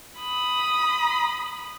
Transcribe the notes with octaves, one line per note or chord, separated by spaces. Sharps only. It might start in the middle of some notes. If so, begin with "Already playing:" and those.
B5 D#6